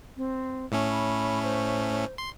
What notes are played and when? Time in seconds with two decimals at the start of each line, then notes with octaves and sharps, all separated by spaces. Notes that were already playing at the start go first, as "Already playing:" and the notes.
0.17 C4
0.72 A2 A3 C#4
0.91 B5
1.43 C5
2.18 C6